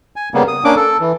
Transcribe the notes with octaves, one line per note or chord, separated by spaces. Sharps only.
G#5
C#3 G3 A#3 B3
D#6
A#3 C#4 D4 D6
A4
E3